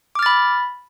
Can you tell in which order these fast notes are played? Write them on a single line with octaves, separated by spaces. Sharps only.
D6 F6 A6 B5